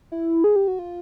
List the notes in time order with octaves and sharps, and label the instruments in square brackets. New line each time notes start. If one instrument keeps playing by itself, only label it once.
[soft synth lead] E4
G#4
G4
F#4
F4